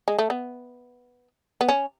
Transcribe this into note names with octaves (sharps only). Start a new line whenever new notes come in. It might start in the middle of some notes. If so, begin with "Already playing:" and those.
G#3
A3
B3
B3
C#4